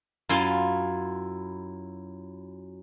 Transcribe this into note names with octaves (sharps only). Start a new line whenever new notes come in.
F#2 E4 F4 F5 G#5 C6